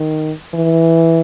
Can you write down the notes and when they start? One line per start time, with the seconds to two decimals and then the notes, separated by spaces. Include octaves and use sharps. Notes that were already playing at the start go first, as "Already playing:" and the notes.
Already playing: D#3
0.54 E3